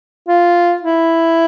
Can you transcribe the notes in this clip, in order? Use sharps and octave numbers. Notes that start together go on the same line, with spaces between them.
F4
E4